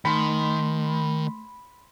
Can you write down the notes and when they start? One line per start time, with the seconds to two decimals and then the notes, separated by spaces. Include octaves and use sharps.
0.05 D#3 A3 B5 C6